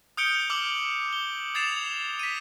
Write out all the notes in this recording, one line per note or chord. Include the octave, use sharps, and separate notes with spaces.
D#6 F6 G6 C#7 D7 G7
D6 E6 F6 F#7 G7
G7
D#6 G#6 A6 C7 E7 F7
B6 D#7